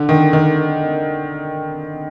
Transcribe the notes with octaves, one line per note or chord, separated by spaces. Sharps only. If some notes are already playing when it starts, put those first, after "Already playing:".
Already playing: D3
D#3
D#3